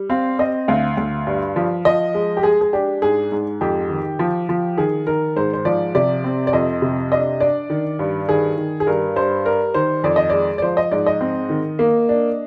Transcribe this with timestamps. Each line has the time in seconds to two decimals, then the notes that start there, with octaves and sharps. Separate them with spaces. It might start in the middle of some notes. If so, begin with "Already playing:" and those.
Already playing: G3
0.10 C4 F5
0.39 C4 D#5
0.68 D2 F5
0.97 D2
1.27 G2
1.56 F3
1.85 F3 D#5
2.14 G#3
2.37 G4
2.43 G#3 G#4
2.61 G#4
2.73 D4 G4
3.02 G#2 G#4
3.32 G#2
3.61 F2 G4
3.90 D#3
4.19 F3
4.49 F3
4.77 D#3 G#4
5.07 D#3 A#4
5.36 G#2 C5
5.53 C5
5.65 F3 D5
5.95 C3 D5
6.24 C4
6.47 D5
6.53 F2 D#5
6.82 C3
7.12 D4 D#5
7.40 D4 D5
7.70 D#3
7.99 G2
8.28 D#3 G#4
8.57 D#3
8.80 G#4
8.87 G2 A#4
9.16 G2 C5
9.45 G3 A#4
9.74 D#3 C5
10.04 F2 D5
10.16 D#5
10.30 G#3 D5
10.58 D5
10.62 F3 C5
10.77 D#5
10.91 G#2 D5
11.06 D#5
11.21 C4
11.50 D#3
11.79 A#3
12.09 D4